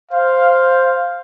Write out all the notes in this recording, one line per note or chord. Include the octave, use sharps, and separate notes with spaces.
C5 F5